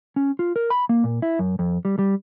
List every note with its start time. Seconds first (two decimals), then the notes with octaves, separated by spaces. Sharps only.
0.16 C#4
0.39 F4
0.56 A#4
0.70 B5
0.89 A#3
1.04 A#2
1.22 E4
1.39 F#2
1.59 F2
1.85 G3
1.99 G3